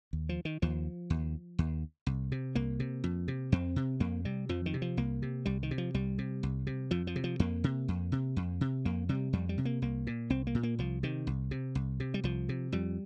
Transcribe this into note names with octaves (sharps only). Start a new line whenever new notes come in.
D#2
F3
D#3
D#2 F3
D#2
D#2
C2
C3
C2 A#3
C3
F2
C3
F2 C4
C3
F2 A#3
C3 G3
F2 F3
D#3
C3
F3
C2 A#3
C3
C2 G3
D#3
C3
F3
C2 G3
C3
C2
C3
F2 F3
F3
C3
F3
F2 A#3
C3
F2
C3
F2
C3
F2 A#3
C3 G3
F2 G3
G3
C3
A#3
C2 A#3
A#2
C2 C4
A#3
A#2
A#3
C2 F3
C3 D#3
C2
C3
C2
C3
G3
C2 F3
C3
F2 G3